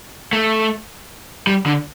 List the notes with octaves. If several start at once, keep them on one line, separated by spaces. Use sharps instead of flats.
A3
G3
D3